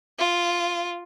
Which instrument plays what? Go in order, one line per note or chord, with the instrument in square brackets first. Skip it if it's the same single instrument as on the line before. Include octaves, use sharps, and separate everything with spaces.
[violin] F4